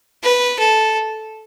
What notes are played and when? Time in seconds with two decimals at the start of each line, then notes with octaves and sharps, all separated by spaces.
0.23 B4
0.59 A4